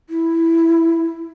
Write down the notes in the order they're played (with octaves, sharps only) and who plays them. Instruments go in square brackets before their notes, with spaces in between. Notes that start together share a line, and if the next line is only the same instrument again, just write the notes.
[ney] E4